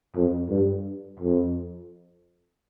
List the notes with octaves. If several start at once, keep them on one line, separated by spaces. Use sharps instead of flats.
F2
G2
F2